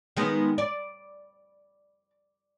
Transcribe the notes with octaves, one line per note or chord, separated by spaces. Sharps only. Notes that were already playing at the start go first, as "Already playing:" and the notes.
D#3 G#3 B3
D5